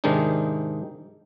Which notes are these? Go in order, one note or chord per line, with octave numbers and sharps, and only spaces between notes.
G#2 C3 D#3 G#3 D4 D#4